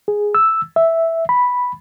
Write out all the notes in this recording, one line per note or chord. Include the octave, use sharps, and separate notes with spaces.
G#4
E6
E5
B5